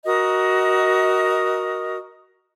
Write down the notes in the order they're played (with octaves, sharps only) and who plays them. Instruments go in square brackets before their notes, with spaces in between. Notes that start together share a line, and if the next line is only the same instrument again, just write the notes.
[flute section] F#4 A#4 D#5 D#6